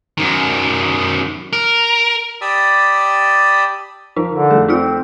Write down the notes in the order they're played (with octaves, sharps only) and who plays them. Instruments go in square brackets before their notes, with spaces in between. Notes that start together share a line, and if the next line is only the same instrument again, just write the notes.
[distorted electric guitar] F#2 D#3
A#4
[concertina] G4 D5 A5 B5 D#6 E6
[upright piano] F3 A#4 [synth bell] D#4
[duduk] D3
[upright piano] F2 A3 [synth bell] G#4
[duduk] C4 [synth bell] D#4 F4 F6